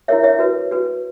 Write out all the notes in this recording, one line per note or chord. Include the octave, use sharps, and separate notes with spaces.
E4 A#4 C#5 E5
C#5 E5
F#4 B4
F#4 B4